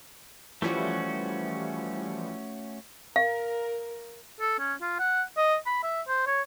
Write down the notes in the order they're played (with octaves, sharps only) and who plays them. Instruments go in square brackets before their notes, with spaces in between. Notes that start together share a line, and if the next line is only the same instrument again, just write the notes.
[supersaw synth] E3 F3 G3 [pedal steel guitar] A3 C#4 F#4
[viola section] A#4 [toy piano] F5
[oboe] A4
C#4
F4
F#5
D#5
B5
E5
C5
C#5